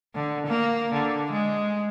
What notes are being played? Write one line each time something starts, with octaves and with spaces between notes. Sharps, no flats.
D3
A#3
D3
G#3